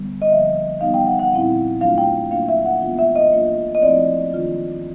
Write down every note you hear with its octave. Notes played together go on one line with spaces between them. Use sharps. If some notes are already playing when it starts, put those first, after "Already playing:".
Already playing: D3 G3 B3
D#5
D3 F3 A#3 E5
E3 G3 B3 D#4 F5
G5
F#5
F#5
A#2 G3 C4 E4 F5
F#3 A3 D4 F4 F5
G5
F#3 A#3 D4 F4 F5
E5
F#5
E3 G#3 B3 D4 F4
E5
D#5
F#3 A#3 D4 F4
D#5
F3 A3 C4 E4 D5
D#3 F#3 A#3 D4 F4